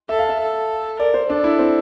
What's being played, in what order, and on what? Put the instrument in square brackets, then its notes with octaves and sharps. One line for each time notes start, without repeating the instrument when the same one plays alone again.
[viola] A4 [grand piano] E5
[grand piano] F5
E5
[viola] A4
[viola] A#4 [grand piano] D5
[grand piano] C5
[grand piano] D4 [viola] A4
[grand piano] E4
C4